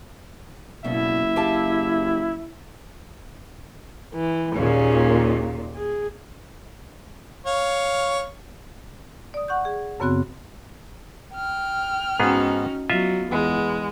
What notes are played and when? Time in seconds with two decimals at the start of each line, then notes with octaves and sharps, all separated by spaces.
0.84 F#1 G2 B2 E4 E5
1.36 G4 F5 A5
4.14 E3
4.56 D#2 A#2 C#4 G#4
5.76 G#4
7.46 C#5 F5
9.34 D5 D#6
9.48 F#5 C#6 F#6 G6
9.65 G#4
10.00 F#2 C#3 B3 C4 F#4 F#6
11.34 G5 F6
12.20 G#2 B3 C#4 D#4 F#4 G#4
12.90 F#3 B3 F4 D#5 E5
13.31 E2 G#3 B3